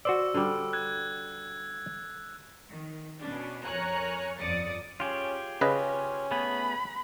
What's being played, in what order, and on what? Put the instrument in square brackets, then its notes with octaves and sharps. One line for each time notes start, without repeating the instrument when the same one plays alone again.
[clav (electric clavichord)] F#4 C5 D5 [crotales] E6
[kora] D3 G3
[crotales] F#6 G#6
[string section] D#3
B2 B3 C#4 D4
F2 A#4 C#5 G#5 A#5 F#6
G1 F2 D5 D#6 A6 C#7
[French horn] C#4 [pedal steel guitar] F4 G4 G#4
[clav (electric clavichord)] C#3 B4 D#5 [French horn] C#4
[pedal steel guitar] A3 B3 G#4 [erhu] B5